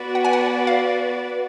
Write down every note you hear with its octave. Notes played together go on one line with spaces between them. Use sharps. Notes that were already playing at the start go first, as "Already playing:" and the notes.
Already playing: B3 F#4 B4 D5
F#5
G#5
F#5
F5